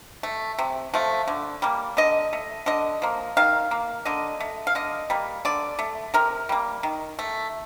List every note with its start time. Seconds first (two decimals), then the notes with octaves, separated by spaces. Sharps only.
0.23 A3
0.59 C3
0.94 F3 A3
1.28 D3
1.62 G3 A#3
1.97 D3 D#5
2.33 A3
2.66 D3 D#5
3.02 F3 A#3
3.37 D#3 F5
3.71 A#3
4.05 D3 D#5
4.40 A3
4.67 F5
4.75 D3 D#5
5.10 G3 A#3
5.45 D3 D5
5.79 A3
6.14 C3 A#4
6.49 G3 A#3
6.83 D#3
7.19 A3